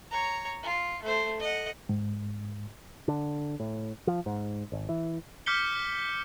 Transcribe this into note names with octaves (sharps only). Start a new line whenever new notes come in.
C#5 A#5
F4
A3 C5
D#5 F#5
G#2
D3
A2
F3
G#2
G#1
E3
D6 F6 G6 B6 C#7 G7